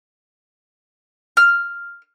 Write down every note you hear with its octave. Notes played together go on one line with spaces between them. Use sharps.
F6